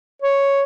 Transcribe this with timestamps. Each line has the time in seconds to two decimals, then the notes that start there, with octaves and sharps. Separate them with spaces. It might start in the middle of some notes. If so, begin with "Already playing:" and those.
0.22 C#5